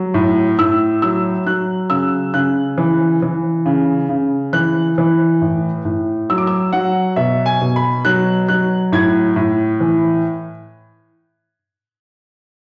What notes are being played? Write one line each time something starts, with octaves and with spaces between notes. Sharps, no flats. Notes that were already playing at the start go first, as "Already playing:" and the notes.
Already playing: F#3
A2
A2 E6
F#3 E6
F#3 F#6
C#3 E6
C#3 F#6
E3
E3
C#3
C#3
E3 F#6
E3
A2
A2
F#3 E6
D6
E6
F#3 F#5
B2 E5
G#5
B2
B5
F#3 F#6
F#3 F#6
A2 G#6
A2
E3